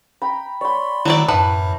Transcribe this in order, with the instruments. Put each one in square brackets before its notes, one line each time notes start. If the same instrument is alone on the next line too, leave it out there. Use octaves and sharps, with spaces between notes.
[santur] G5 A#5 B5
[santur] C#5 B5 [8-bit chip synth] D5 C6
[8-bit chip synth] D#3 [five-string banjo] F#3 A3 D5 [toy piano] E4
[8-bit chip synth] F#2 A2 [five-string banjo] E3 F#5 [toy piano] A5